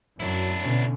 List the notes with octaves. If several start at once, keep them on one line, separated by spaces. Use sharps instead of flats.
F#2 F#3 D4 E4
B2 D3 C#4